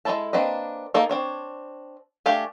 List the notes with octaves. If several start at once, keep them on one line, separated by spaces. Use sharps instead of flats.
G#3 D#4 E4 A4 A5
A#3 C4 D4 B4 D#5
A#3 D#4 G#4 A4
C4 D4 C#5
A3 D4 G4 F5 G#5